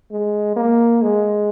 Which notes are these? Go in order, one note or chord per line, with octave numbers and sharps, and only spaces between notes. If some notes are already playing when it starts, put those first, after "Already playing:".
G#3
A#3
G#3